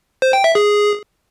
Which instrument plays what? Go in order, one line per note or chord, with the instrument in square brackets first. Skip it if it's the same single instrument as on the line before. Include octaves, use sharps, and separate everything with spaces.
[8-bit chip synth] C5
G5
E5
G#4